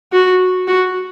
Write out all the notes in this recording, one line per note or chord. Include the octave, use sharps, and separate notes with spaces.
F#4
F#4